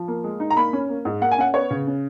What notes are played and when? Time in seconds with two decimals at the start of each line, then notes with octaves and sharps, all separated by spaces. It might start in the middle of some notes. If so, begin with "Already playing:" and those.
Already playing: F3
0.08 A#3
0.24 G#3
0.40 D#4
0.50 A#5
0.57 A#3 B5
0.73 C#4
0.89 A#3
1.05 G#2
1.21 A#3 F#5
1.32 G#5
1.38 C#4 F#5
1.54 B3 C#5
1.71 C#3
1.87 C#4